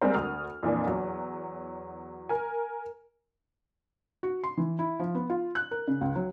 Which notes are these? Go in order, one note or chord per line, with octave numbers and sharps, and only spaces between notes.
G3 G#3 A#3 C4 A#4 C5
D2 D#6 F6
F2 A#2 E3 D4
E2 F#3
A#4 G#5
F#4
C6
E3
E4
F3
B3
F4
F#6
A#4
C#3
C#2
F#3